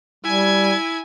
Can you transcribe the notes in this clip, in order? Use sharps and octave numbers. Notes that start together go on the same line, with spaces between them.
G3 E4 G#5 G#6